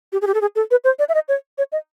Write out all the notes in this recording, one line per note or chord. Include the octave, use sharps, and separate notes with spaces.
G4
G#4
G4
A4
G#4
A4
B4
C5
D5
E5
D#5
C#5
C#5
D#5